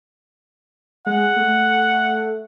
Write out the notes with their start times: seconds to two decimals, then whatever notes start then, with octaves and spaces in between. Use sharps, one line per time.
1.06 G#3 F#5
1.36 A3